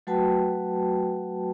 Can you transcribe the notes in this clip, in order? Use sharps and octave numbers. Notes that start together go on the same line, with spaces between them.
F#3 A3 F#4 B4 G5 A5